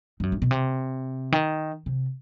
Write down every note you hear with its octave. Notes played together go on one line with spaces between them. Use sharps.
G2
F#2
G2
B2
C3
D#3
C3